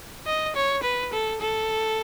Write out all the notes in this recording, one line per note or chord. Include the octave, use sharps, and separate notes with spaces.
D#5
C#5
B4
A4
A4